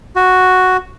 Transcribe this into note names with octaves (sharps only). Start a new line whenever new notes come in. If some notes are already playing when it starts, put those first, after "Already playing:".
F#4